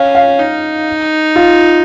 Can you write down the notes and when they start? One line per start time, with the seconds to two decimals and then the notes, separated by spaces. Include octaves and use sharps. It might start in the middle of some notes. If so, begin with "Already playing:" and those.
Already playing: C#4 F5
0.15 F5
0.40 D#4
1.36 F4